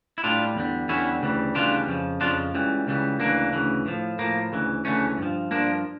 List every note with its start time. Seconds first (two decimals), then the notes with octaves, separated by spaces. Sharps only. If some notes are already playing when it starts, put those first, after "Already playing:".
0.18 E4
0.24 A2 G3 D4 F4
0.56 E2 D3 G3
0.89 E2 D3 G3 C#4 E4
1.22 D2 C#3 E3 G3
1.55 D2 C#3 E3 G3 D4 F4
1.88 F2 C#3 F3
2.21 F2 C#3 F3 D4 F4
2.54 C#2 C#3 E3 G3
2.87 C#2 C#3 E3 G3
3.20 D2 C#3 E3 A#3 D4
3.53 D2 C#3 E3
3.86 A2 F3
4.19 A2 F3 A#3
4.52 D2 C#3 E3
4.85 D2 C#3 E3 A3 C#4
5.18 G2 F3
5.51 G2 F3 A#3 D4